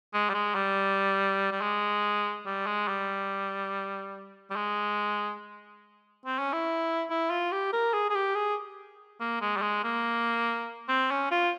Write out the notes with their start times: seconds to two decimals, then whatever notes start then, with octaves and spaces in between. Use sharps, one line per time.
0.14 G#3
0.30 G3
0.34 G#3
0.55 G3
1.52 G3
1.61 G#3
2.46 G3
2.66 G#3
2.88 G3
4.50 G3
4.56 G#3
6.26 C4
6.39 C#4
6.53 E4
7.10 E4
7.30 F4
7.52 G4
7.73 A#4
7.94 G#4
8.10 G#4
8.15 G4
8.35 G#4
9.20 A#3
9.41 G#3
9.57 G3
9.62 G#3
9.84 A#3
10.89 C4
11.11 C#4
11.31 F4